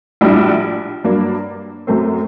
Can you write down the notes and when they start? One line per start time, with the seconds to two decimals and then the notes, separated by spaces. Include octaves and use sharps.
0.21 A#1 A2 G3 D4 F#4
1.04 G2 F#3 A#3 D4
1.87 F#2 F#3 A3 C4